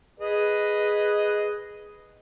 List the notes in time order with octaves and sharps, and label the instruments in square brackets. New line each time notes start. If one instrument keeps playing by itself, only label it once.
[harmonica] G#4 B4 D#5